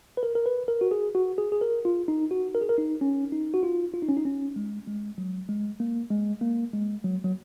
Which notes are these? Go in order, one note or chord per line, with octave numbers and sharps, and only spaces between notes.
B4
A#4
A#4
B4
A#4
F#4
G#4
F#4
G#4
G#4
A#4
F4
D#4
F#4
A#4
G#4
A#4
D#4
C#4
D#4
F#4
F4
F4
D#4
C#4
D#4
C#4
G#3
G#3
F#3
G#3
A#3
G#3
A#3
G#3
F#3
F#3